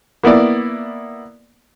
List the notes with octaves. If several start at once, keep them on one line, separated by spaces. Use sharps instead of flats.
A#3 B3 E4 D5